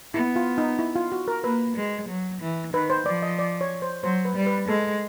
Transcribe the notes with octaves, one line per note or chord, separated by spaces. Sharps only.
B3 E4
F4
D#4
E4
F4
F#4
A#4
A#3 B4
G#3
F#3
E3
D#3 B4
C5
F3 D5
D#5
D5
C#5
C5
F#3 C5
B4
G3
B4
G#3 A4